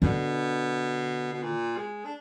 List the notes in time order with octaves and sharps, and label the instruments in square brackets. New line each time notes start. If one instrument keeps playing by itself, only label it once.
[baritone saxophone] B2 [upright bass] D3
[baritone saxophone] B2
A#2
G#3
D4